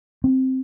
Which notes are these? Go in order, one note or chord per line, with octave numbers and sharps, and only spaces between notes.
C4